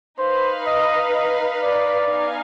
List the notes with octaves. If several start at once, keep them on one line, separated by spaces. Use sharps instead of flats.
D#4 B4 C5 F5
D#5
D#5
D5
B3 D#4 B4 F5 G#5